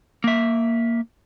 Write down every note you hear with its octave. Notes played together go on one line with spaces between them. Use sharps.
A#3 E5